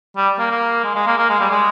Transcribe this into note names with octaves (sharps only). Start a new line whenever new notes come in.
G3
A#3
A#3
G#3
G#3
A#3
A#3
G#3
G3
G#3